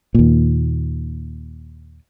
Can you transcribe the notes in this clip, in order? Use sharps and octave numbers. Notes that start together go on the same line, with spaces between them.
D#2 A#2